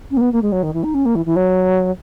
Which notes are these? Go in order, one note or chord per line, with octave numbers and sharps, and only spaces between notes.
C#4
A#3
B3
A#3
G#3
F#3
D#3
E3
D#4
C#4
A#3
E3
E3
F#3